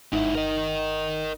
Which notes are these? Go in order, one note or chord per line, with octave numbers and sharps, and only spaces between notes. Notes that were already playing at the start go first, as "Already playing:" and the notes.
G1 G#2 D#4 E4 F#5
A#4 D#5